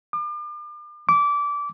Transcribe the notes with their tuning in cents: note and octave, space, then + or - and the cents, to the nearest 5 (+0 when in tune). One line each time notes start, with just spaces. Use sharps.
D6 +40
D6 -20